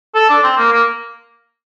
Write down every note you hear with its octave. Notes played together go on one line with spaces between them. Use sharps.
A4
D4
C4
A#3
A#3